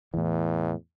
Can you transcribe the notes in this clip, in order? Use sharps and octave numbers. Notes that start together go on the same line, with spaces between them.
E2 A2 E3